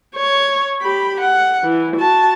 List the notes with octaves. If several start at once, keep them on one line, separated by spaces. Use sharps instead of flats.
C#5
G4 B5
F#5
E3
F#4 A5